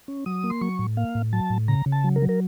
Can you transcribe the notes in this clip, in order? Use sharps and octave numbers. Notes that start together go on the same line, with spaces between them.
C#4
F#3 D#6
A#3
C6
F#3 C#6
A2
A#3 F5
A2
F#3 A5
A2
C#3 A#5
C#3
A5
F#3
A#4
F#3
A#4